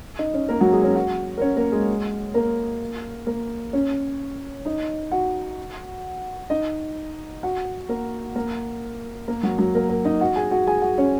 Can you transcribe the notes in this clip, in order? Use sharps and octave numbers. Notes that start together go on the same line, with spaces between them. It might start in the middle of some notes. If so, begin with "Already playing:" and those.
D#4 D#5
C#4 C#5
A#3 A#4
F#3 F#4
G#3 G#4
C#4 C#5
F#4 F#5
A#4
C#4 C#5
A#3 A#4
G#3 G#4
A#3 A#4
A#3 A#4
C#4 C#5
D#4 D#5
F#4 F#5
D#4 D#5
F#4 F#5
A#3 A#4
A#3 A#4
A#3 A#4
F#3 F#4
F#3 F#4
A#3 A#4
A#3 A#4
D#4 D#5
F#4 F#5
G#4 G#5
F#4 F#5
G#4 G#5
F#4 F#5
C#4 C#5